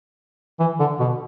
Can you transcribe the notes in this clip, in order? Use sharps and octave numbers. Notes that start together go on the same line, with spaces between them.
E3
D3
B2